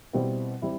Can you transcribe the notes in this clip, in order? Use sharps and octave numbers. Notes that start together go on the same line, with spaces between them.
B2 G3 C4 E4
G3 C4 E4